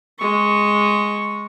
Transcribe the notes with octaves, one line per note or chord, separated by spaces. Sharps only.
G#3 C#6